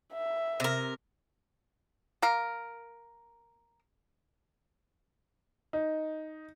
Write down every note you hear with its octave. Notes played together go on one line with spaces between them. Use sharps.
E5
C3 A#4
A#3 A#4
D#4